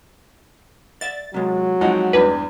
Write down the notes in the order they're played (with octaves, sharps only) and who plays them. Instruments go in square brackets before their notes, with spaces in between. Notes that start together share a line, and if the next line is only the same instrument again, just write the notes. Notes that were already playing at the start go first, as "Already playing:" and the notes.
[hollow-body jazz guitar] D5 E5 [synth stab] A6
[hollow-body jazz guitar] C3 G#3 [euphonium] F#3
[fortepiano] F3 D#4 F#5 [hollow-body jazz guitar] G#3 C4
[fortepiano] E2 G2 [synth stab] B4